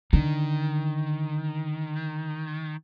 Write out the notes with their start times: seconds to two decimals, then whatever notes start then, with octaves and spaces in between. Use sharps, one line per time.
0.13 D3 D#3